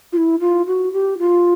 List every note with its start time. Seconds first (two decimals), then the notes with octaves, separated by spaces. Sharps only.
0.12 F4
0.17 E4
0.40 F4
0.66 F#4
0.92 G4
1.18 F4